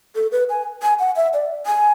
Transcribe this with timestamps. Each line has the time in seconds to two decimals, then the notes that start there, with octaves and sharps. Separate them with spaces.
0.15 A4
0.32 B4
0.49 G#5
0.82 G#5
0.99 F#5
1.16 E5
1.34 D5
1.66 G#5